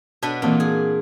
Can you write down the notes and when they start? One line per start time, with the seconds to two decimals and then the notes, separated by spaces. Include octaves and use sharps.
0.23 B2 D4 B4 A5
0.42 A#2 E3 A#3 C4
0.60 G#4